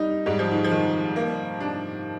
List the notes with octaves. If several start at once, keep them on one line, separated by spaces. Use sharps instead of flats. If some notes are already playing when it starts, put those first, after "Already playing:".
Already playing: G3 D#4
G#2 G3
F3
D#3
F3
D#3
A#3
D4